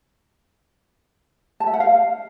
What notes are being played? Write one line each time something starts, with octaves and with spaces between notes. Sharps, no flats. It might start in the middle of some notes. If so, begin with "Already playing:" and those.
A5
E5
F#5
F5